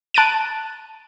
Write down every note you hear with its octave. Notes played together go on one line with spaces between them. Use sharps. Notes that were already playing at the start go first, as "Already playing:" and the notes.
A5 F#6 A6 D7 D#7